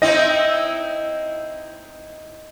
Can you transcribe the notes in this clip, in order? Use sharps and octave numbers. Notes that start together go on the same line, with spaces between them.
C4 D#4 E4 D#5 A#6